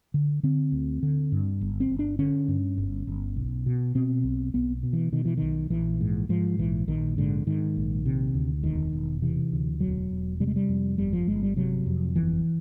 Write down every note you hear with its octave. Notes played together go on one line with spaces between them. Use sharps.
D3
D3 C4
D2
D3
G2
G1
C4
G1
D4
D3 C#4
G2
G1
G1
B1
B2
B2 C4
B1
B1 B3
B2
E3
B2 D#3
E3
B1 D#3
A#1 E3
G#2
G#2 F3
A#1 E3
A#1 D#3
G#2 D3
G#2 D#3
A#1
C3
D2
E1 D#3
E1
C3 E3
D2
E1 F#3
E1
C3 G3
G#3
G3
F2
G1 G3
F3
G1 G#3
G3
C3 F#3
F2
G1 E3